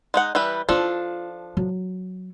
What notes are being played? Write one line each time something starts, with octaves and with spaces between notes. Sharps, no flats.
G#3 D#4 F#5
E3 G3 B4
F3 D4 F4 A4
F#3